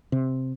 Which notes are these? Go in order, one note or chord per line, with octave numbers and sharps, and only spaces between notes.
C3